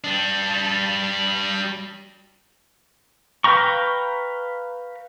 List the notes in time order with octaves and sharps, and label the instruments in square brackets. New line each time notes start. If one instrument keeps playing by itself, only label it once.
[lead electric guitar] G3 D4
[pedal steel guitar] B4 F5 G5 A#5 C#6